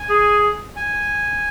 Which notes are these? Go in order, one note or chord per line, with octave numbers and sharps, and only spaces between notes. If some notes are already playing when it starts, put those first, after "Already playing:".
Already playing: G#5
G#4
G#5